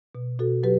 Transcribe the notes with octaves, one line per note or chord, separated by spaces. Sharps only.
B2
B2 F#4 A4
F#3 G4 B4